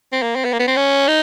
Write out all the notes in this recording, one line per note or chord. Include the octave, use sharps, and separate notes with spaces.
C4
A#3
C4
B3
A#3
B3
C4
C#4
D#4